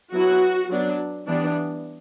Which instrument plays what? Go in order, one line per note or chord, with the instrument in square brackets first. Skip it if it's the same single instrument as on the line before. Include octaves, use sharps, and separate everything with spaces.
[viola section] F#3 B3 E4 F#4
F#3 B3 D4
E3 G3 B3 D4